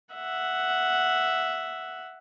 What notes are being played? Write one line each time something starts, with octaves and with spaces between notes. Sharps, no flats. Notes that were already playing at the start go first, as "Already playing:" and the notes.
E5 F#5